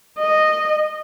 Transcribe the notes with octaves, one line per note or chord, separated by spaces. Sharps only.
D#5